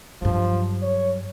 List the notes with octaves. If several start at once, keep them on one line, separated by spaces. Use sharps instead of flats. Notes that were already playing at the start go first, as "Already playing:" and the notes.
G2 F3 F#3
C#5